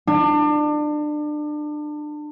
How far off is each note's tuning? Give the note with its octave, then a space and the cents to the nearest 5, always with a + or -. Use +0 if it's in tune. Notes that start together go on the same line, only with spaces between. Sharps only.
D4 +30